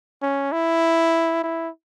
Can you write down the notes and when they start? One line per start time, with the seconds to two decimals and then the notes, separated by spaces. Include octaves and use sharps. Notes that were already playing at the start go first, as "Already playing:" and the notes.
0.22 C#4
0.52 E4
1.44 E4